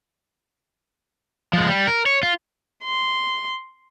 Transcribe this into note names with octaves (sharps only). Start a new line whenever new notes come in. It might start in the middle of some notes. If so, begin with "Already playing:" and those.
F3 G#3
G3
A#4
C#5
F4
C6